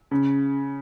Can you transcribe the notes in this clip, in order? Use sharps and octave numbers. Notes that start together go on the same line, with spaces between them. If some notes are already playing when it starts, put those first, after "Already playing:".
C#3